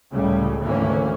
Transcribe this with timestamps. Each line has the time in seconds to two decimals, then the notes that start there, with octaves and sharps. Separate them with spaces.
0.11 C#2 A2 C#3 G3
0.63 G#1 D2 E3 A#3 C#4